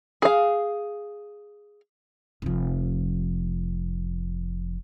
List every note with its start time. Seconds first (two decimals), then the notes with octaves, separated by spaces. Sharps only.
0.22 G#4 F5
2.42 F1 F3